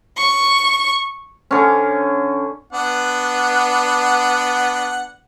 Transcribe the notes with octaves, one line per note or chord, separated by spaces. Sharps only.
C#6
D3 C#4
B3 D4 F#5